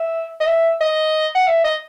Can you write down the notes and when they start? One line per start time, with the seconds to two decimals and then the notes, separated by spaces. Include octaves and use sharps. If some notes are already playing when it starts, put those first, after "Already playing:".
Already playing: E5
0.40 D#5
0.47 E5
0.81 D#5
1.35 F#5
1.48 E5
1.64 D#5